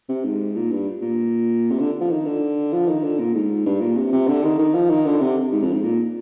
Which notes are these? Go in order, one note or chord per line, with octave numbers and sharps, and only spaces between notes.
C3
G#2
A#2
G2
A#2
C3
D3
F3
D#3
D3
F3
D#3
D3
A#2
G#2
G2
A#2
C3
C3
D3
D#3
D#3
F3
D#3
D3
C3
G#2
F2
G#2
A#2